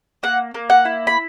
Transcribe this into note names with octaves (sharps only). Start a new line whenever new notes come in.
A#3 F#5
A#3
F#5
E4
B5